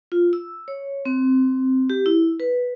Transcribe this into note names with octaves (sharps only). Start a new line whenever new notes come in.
F4
E6
C#5
C4
G4
E4
B4